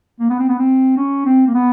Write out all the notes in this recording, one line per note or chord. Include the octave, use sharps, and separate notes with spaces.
A#3
B3
C4
B3
C4
C#4
C4
A#3
B3